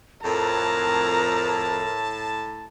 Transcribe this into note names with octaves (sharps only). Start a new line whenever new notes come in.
F2 A2 A#4 A5 A#5